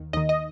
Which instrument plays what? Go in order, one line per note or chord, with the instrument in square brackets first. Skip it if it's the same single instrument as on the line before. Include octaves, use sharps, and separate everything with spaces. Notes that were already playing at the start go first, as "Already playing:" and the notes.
Already playing: [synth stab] D#2 D#3
D#2 D#3 D#5
D#5